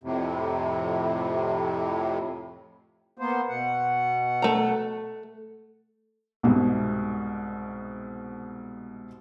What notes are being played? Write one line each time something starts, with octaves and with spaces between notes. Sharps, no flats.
F2 A2 C3
A#3 B3 C5
B2 F#5
A3 A#5
C2 G#2 B2